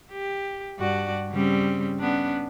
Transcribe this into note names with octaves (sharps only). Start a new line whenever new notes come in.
G4
G2 F#4 D5
C#3 G3 C4
B3 C#4 D4